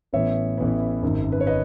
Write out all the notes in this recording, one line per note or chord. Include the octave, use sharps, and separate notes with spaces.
A1 A2 E3 B3 C#5 E5
A1 A2 E3 B3
G#1 F#2 D#3
B4
C#5
B4 D#5